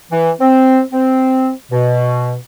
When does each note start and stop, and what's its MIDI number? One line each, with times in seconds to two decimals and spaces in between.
0.11 0.31 52
0.40 0.80 60
0.92 1.50 60
1.72 2.34 47